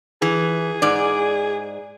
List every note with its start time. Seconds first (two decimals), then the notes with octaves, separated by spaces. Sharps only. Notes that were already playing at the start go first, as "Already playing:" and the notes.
0.22 E3 G#4
0.82 G#2 D5